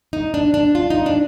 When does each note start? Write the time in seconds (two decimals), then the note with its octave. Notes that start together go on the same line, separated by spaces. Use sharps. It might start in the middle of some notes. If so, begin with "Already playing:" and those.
0.13 D#4
0.34 D4
0.54 D4
0.75 F4
0.90 D#4
1.06 D4